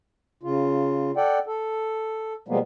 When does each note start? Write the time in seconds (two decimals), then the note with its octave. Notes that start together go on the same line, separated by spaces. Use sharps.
0.43 C#3 F4
1.17 A4 D5 F#5 G5
1.46 A4
2.48 B2 F3 G3 G#3 A#3 B3